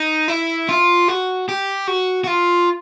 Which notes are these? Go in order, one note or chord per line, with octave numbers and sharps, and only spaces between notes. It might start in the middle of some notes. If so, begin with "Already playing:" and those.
Already playing: D#4
E4
F4
F#4
G4
F#4
F#4
F4